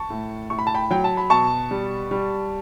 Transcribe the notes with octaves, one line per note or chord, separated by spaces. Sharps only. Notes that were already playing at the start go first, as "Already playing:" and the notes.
Already playing: A5 C#6
A2
A2 C#6
B5
A5
G5 B5
F#3 G5
A5
B5
B2 A5 C#6
G3
G3